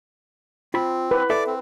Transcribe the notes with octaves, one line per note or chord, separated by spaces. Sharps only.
C4 F4 B5
B4
A4 D5 E5 D6
C4